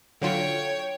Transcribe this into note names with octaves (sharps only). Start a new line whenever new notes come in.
D3 F#3 F4 C#5 G5